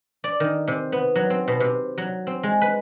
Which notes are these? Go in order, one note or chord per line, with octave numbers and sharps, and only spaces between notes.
D5
D#3
C3
B3
F#3
C4
B2
C3
F#3
C4
G#3
B4